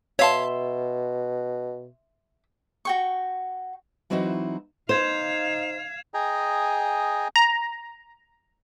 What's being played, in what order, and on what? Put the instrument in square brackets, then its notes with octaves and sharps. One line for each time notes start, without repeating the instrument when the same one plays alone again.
[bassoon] B2 [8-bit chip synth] C#5 F5 A5 [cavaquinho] E5 C6
[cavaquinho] F#4 G5 C#6
[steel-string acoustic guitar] E3 F#3 C4 D#4 E4 F#4
[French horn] D#4 [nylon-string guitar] C5 [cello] F5 [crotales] G#6 E7
[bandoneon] G#4 D#5 G5 G#5 A#5
[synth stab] A#5